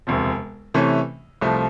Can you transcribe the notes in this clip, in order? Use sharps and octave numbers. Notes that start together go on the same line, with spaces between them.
E1 D2 C3 F3
C3 E3 A3 C#4
C2 C3 F3 A3